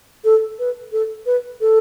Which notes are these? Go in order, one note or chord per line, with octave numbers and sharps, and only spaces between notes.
A4
B4
A4
B4
A4